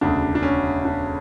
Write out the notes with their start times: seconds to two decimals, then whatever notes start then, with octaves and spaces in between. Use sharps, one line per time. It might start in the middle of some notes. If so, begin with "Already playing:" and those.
0.01 E1 D2 C#3 D4
0.35 D4
0.43 C#4
0.85 D4